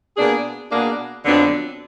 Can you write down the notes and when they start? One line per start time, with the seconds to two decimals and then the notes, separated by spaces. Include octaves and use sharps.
0.16 B2 A#3 D4 G#4
0.71 B2 A#3 D4 G#4
1.25 F2 D3 F#3 B3 D4